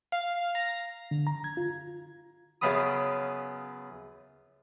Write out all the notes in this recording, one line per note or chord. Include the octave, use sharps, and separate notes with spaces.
F5
A#5
D3
A#5
G#6
F4
F#2 C#3 B3 F5 B5 D#6